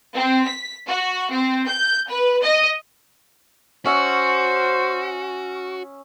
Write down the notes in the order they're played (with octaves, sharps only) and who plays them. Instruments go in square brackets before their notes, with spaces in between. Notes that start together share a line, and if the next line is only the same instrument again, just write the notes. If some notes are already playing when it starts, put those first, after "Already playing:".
[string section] C4
B6
F#4
C4
G6
B4
D#5
[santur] C#4 E5 [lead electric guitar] F#4 [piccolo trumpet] C5 [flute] F#5